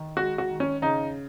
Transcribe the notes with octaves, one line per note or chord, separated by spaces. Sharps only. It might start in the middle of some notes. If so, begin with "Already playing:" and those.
Already playing: D#3
G#3 F#4
F#4
D#3
C#4
C#3 D#4